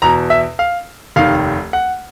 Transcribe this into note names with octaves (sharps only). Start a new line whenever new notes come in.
E2 B2 A#5
E5
F5
F1 D#2 D#3 F5
F#5